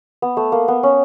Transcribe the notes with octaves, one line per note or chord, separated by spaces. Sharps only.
B3
A3
A#3
B3
C#4